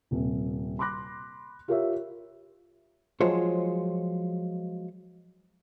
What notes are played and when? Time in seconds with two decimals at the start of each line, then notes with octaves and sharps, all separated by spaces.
0.11 D#1 C3
0.79 B5 C6 D6 F#6 A#6
1.68 F4 G4 A#4 C#5 E5
3.21 F3 F#3 G#3 F4 C5 C#5